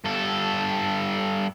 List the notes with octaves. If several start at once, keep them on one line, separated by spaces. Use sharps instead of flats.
G2 A4